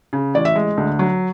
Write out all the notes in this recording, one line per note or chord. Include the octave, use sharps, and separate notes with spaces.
C#3
A1 D5
E5
G#3
D2
F#3